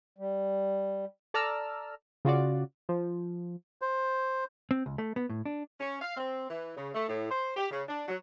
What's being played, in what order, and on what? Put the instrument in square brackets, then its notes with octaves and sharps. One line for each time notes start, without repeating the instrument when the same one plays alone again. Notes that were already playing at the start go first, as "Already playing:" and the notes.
[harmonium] G3
[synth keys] A4 D5 A5 A#5 E6 F6
C#3 F4 F#4 D5
F3
[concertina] C5
[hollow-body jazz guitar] C4
C#2
A3
B3
A2
D4
[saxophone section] C#4
F5
C4
E3
C#3
A3
A2
C5
G4
C#3
D4
F#3